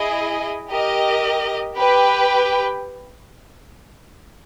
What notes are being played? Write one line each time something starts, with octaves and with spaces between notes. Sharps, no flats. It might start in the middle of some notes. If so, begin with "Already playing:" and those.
Already playing: E4 G#4 D#5
G4 A#4 D#5
G4 B4 G5